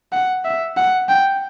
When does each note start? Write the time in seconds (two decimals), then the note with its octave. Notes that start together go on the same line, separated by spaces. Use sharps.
0.12 F#5
0.45 E5
0.77 F#5
1.09 G5